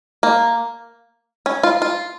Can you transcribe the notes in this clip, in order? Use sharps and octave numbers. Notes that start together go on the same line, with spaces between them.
A#3
C#4
F4
F4